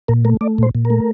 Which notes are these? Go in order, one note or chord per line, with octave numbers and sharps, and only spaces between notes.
A#2 A#4
A3 A#4
A3 D5
A#2 C5
A#2
A#4
A3